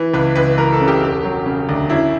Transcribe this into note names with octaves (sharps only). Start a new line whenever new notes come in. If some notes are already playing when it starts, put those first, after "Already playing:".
Already playing: E3
C#2 B4
C#2 B4
E3 A#4
A4
C#3
G4
E1
F#3
C#3
D2
F#2 E4